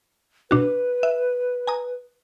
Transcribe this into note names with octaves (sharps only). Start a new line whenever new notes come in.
B2 D4 F#4 B4
E5
G#5 A#5 D#6